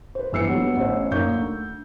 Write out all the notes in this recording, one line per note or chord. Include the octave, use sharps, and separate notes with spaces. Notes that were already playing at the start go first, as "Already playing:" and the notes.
B4 C5
G1 E3 E6 C7 C#7
D3 F#3 G3 B3
A1 C#4 C5
F#2 A#2 A#3 D#4 C#6 G6
D2